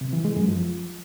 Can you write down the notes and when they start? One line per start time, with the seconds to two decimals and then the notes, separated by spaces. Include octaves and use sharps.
0.01 C3
0.13 E3
0.25 G#3
0.36 F#2
0.48 F3